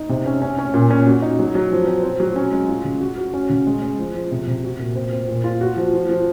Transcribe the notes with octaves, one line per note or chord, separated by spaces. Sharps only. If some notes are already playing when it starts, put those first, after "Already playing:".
Already playing: D#4
C3
C#4
C#4
C#4
A#2
C#4
F#4
D#4
F#3
F#3
F3
C4
C4
F#3
C#4
G#3
F4
C#3
F#4
F#4
C#4
C#3
G#3
G#3
F3
F3
C3
C3
F#4
A#2
C4
C4
A#2
F4
F#4
F3
F3
F3